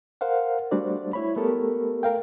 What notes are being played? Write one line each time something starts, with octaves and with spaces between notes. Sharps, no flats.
A#4 C5 F5 F#5
G3 A3 D4 F#4 C5 D5
E4 C#5 B5
A3 B3 G4 A4 A#4
A4 A#4 F5 G5